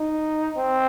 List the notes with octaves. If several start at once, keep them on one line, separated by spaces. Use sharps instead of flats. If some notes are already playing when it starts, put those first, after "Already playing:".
Already playing: D#4
C4